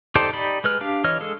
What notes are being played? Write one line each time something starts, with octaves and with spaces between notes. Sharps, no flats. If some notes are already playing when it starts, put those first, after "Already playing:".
D#4 G4 A4 C5 D5
D#4 G4 D5 B5
G#3 B4 F6
D4 G4 F5
E3 C#5 D#5 F6
G#3 G#4 A4